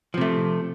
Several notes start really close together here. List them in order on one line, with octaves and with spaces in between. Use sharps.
F3 C3 A3